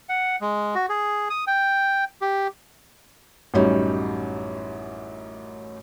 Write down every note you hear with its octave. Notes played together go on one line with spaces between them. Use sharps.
F#5
G#3
F#4
G#4
D#6
G5
G4
A1 F#2 G3 C#4 D#4